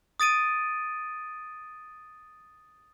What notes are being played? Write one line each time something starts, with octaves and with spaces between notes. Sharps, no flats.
D#6 A6 D7 D#7